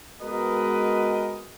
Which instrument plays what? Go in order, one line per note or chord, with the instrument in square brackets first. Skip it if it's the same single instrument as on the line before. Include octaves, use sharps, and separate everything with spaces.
[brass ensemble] G#3 B3 F#4 A#4 B4 D#5